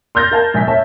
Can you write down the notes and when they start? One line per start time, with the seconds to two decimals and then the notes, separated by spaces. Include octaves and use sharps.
0.15 C6 F6 G6 A6 A#6
0.31 A#4 F5 A5 G#6
0.54 A#1 G#5 B6
0.67 C#5 E5 A5